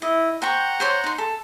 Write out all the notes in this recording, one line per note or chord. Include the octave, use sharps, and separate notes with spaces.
E4 D#5
C5 F#5 G5 A#5 C#6
C5 C#5 C6
D#4 C6
A4